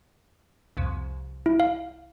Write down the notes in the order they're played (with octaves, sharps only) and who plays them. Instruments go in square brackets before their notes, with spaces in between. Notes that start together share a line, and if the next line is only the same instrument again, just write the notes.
[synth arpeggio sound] C2 F2 C3
[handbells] E4
F5